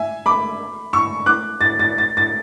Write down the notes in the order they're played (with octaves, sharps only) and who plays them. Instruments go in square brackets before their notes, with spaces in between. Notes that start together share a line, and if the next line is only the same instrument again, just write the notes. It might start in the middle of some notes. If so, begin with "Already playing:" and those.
Already playing: [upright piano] E5 G#5
B5 D6
C#6 E6
D6 F#6
A6
A6
A6
A6